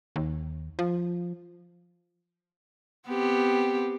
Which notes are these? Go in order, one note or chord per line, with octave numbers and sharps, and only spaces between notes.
D#2
F3
B3 C4 G4